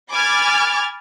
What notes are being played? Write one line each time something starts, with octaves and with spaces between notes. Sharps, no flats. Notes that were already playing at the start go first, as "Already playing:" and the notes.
G#5 B5 D6 F6 G#6 A6